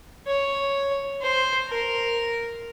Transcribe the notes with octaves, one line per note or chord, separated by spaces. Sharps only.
C#5
C5
A#4